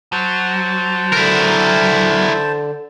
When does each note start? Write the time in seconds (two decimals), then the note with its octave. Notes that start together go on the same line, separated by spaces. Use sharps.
0.13 F#3 C5 A5
1.13 D3 E4 A#4